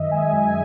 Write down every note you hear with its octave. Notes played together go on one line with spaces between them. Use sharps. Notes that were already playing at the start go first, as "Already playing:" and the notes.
Already playing: F#2 D#3 D#5 E5
G#3 G#5
F#2 G#5
G#5